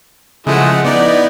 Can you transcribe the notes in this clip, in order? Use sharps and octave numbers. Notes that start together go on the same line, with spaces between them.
C#3 F3 G#3 A3 E4 F#5
B3 D#4 E4 D5